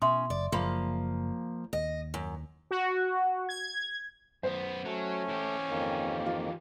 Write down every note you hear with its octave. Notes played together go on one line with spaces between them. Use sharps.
B2 C#4 E5 C6 D#6
F#1 D5
F#1 F3 A#3 G#4 B5
D#2 D#5
F#2
F#4
G#6
F#2 B3 C5
F#3 A3 C#4
E3 G4
F2 D#3 A#3
F4